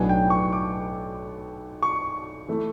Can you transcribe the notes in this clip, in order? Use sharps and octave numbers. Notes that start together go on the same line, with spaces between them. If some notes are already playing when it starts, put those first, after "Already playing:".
Already playing: B1 A2 F#3 B3 D4 G#5
G5
C#6
D6
C#6
E3 A3